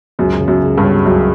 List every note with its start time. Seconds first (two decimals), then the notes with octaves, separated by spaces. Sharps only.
0.19 C#2 F#2
0.41 C#3
0.48 F#2
0.63 C#2
0.78 G2
0.84 F#3
1.06 C#2 F#2